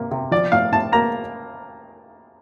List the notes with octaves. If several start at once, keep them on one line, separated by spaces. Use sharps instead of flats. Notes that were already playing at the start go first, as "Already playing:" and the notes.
Already playing: C3 A#3
C3
F3 D5
A2 F5
A2 A5
A#3 A#5